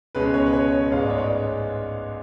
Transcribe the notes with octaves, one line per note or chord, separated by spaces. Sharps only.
C#2 B2 G#3 C#4 B4
C#5
B4
C#5
C#5
A1 G#2 G#3 B3 F5
D5
C#5
D5